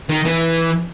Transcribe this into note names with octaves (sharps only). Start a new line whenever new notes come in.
D#3
E3